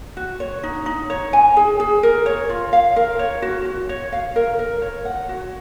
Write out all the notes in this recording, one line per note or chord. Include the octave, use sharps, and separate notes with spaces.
F#4
C#5
D#4
D#4
C#5
G#5
G#4
G#4
A#4
C#5
F4
F5
A#4
C#5
F#4
F#4
C#5
F5
A#4
A#4
C#5
F#5
F#4